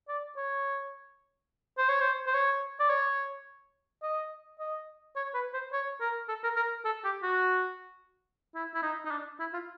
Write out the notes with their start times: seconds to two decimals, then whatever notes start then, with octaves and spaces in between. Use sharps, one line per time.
0.08 D5
0.36 C#5
1.78 C5
1.88 C#5
2.01 C5
2.27 C5
2.34 C#5
2.80 D5
2.90 C#5
4.03 D#5
4.59 D#5
5.16 C#5
5.34 B4
5.54 C5
5.73 C#5
6.01 A#4
6.29 A4
6.43 A#4
6.56 A#4
6.85 A4
7.04 G4
7.23 F#4
8.55 E4
8.74 E4
8.83 D#4
9.05 D#4
9.11 D4
9.40 E4
9.53 F4